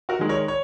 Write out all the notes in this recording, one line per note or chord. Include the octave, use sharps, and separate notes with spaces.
F#4 A#4
D#3 G#3
A#4 C#5
C#5